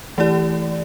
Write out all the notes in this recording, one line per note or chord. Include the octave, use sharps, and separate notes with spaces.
E3 A3 E4 G4 D5